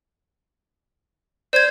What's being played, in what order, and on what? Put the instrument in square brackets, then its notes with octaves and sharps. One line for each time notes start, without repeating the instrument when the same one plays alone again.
[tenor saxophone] C5 [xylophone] D5 G#6